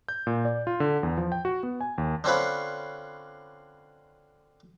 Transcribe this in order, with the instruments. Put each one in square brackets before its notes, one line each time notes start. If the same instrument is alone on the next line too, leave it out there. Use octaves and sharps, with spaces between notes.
[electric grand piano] G6
A#2
D5
F4
D3
E2
F3
G5
F#4
B3
G#5
D#2
[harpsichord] D3 C4 C#4 F4 B4